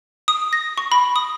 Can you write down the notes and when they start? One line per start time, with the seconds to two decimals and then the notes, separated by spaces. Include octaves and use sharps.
0.28 D#6
0.53 A#6
0.78 C#6
0.92 B5
1.16 D#6